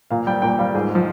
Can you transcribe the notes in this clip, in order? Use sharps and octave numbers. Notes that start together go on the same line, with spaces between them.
A#2 F5
G3 G5
A#2 G5
G3 F5
G#2 G#4
G#3
F3